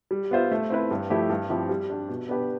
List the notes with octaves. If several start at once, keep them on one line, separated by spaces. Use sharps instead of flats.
G3
B3 F4 C5 E5
A3
C4 E4 B4
G2
F3 A3 E4 G4
G2
F3 C4 E4 G4
G3
D4 G4
B2
B3 D4 G4 B4